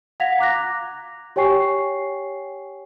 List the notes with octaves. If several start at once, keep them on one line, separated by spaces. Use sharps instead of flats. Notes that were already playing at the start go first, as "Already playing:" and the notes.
F5 F#5 G#6 A#6 B6 F7
A#5 D6 F#6 A#6
G4 C#5 G5 G#5 C#6 C7